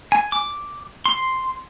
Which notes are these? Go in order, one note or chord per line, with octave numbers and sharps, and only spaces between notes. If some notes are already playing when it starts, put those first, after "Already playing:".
G#5
D6
C6